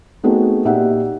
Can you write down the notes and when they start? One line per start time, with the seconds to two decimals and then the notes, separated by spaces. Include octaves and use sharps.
0.24 A3 B3 C4 D#4 F#4 G#4
0.65 A#2 D#4 G4 E5 F#5